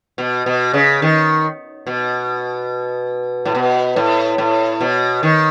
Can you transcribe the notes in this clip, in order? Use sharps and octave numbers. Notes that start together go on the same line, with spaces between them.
B2
B2
C#3
D#3
B2
A2
B2
A2
A2
B2
D#3